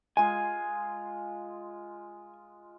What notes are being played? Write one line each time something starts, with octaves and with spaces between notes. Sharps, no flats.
G#3 F4 G#5